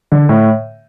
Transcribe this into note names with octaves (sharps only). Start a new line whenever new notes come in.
D3
A2